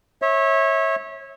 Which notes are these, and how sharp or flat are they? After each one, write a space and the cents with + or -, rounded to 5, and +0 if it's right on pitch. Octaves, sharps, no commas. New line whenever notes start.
C#5 -25 E5 -25